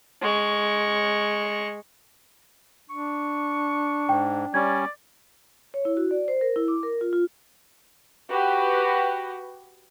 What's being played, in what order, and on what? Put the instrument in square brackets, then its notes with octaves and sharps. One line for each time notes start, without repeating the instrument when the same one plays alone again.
[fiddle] G#3 C#6
[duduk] D4 [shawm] C#6
[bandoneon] G#2 [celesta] G5
[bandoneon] G3 C#4 [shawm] D5 [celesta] G#6
[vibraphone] C#5
E4
F#4
D5
C5
A#4
E4
D6
A#4
F4
F4
[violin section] F#4 G4 B4